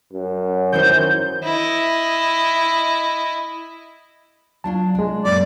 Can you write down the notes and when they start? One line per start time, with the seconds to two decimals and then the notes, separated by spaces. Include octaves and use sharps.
0.13 F#2
0.72 D#3 E3 C5 G6
1.43 E4 D#5
4.64 F#3 D4 F4 A5
4.95 C2 G#3 D4
5.25 F#2 A#2 D5